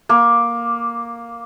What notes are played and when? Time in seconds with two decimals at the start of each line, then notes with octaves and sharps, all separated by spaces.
0.09 A#3